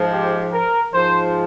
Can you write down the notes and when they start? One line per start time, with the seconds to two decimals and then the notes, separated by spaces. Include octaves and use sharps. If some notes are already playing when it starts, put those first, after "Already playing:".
Already playing: G#2 F3
0.12 G4
0.52 A#4
0.93 G#2 F3 C5